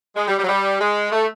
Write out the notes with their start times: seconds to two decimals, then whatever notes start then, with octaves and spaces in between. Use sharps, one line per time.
0.16 G#3
0.27 G3
0.38 G3
0.44 F#3
0.48 G3
0.80 G#3
1.12 A3